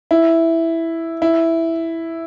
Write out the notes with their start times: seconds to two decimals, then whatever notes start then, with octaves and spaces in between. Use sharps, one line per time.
0.11 E4
1.22 E4